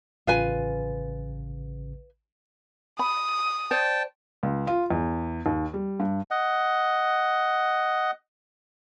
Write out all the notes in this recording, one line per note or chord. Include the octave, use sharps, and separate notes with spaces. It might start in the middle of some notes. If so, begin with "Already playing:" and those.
A1 C#3 F4 B4 G#5
B5 D#6
C5 D5 G5 A5
C#2
F4
E2
D#2
G3
G2
D#5 F#5